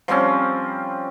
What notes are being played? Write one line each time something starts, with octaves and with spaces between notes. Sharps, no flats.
F3 G3 C4 C#4